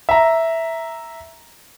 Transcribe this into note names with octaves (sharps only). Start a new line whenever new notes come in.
E5 A#5